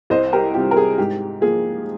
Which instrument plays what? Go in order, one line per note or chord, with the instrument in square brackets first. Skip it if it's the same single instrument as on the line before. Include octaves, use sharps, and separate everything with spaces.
[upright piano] C2 C5 D#5
G4 A#4
C3 G3 C4 F4 G4
A#4
G#4
G#2 G4
F3 A#3 G#4